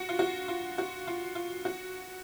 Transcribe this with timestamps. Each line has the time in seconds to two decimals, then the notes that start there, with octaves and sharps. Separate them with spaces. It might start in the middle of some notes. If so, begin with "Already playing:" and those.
Already playing: F#4
0.09 F4
0.19 F#4
0.48 F4
0.78 F#4
1.07 F4
1.35 F4
1.65 F#4